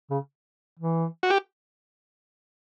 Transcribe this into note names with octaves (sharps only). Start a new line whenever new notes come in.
C#3
E3
F#4
G4